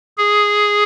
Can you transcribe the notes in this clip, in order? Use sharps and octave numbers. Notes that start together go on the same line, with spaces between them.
G#4